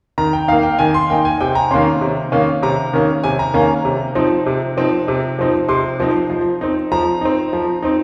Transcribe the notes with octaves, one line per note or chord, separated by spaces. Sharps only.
D#3 A#5
G5
A#3 D#4 F5
G5
D#3 G#5
C6
A#3 D#4 G5
G#5
C3 G5
A#5
D#3 A#3 C#4 C6
C3
D#3 A#3 C#4
C3 A#5
D#3 A#3 C#4
C3 G#5
A#5
D#3 A#3 C#4 A#5
C3
F3 C4 D#4
C3
F3 C4 D#4
C3
F3 C4 D#4
C3 C6
F3 C4 D#4
F3
C4 D#4
F3 A#5
C4 D#4
F3
C4 D#4